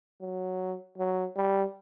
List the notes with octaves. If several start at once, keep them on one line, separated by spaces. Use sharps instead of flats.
F#3
F#3
G3